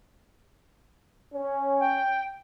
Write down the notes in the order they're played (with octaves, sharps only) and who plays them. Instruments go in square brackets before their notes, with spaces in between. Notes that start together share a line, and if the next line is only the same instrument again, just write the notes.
[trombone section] C#4
[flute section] G5